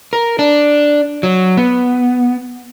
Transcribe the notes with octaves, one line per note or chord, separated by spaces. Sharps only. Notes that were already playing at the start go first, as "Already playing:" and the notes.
A#4
D4
F#3
B3